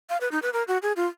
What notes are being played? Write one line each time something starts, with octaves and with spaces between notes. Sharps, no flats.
F5
B4
D#4
B4
A#4
F#4
G#4
F4